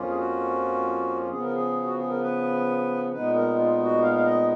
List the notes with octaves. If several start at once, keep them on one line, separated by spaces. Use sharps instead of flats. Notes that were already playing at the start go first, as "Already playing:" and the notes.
Already playing: F2 F3 A#3 C#4 F4
G#4
F#4
C#3 F3 B3 G#4
A#4
G#4
F#4
G#4
A#4
B4
A#2 G#3 B3 D#4 B4
A#4
F4
F#4
F5
F5
D#5